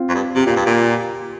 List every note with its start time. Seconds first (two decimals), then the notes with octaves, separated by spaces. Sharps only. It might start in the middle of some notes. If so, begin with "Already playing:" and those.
Already playing: C4 F4
0.09 F2
0.14 G2
0.36 C3 G4
0.46 A#2 F4
0.56 G2 G4
0.66 A#2 F4